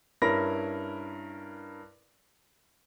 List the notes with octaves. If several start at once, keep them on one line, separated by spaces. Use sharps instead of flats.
G2 C#4 E4 A#4 B5 A#6